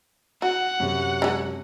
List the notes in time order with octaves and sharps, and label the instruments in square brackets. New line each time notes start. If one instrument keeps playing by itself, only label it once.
[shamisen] F#4 [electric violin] F#5
[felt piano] F#2 C3
[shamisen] D3 G#3